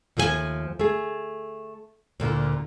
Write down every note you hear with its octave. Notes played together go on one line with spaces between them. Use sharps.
D#2 F3 A3 G4 G#5
A3 G#4
D2 A#2 D3